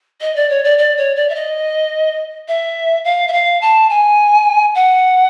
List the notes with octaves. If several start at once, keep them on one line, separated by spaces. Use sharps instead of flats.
D#5
D5
C#5
D5
D5
C#5
D5
E5
D#5
E5
F5
E5
F5
A5
G#5
F#5